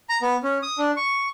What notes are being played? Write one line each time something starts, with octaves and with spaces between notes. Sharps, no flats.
A#5
B3
C#4
D#6
D4
C#6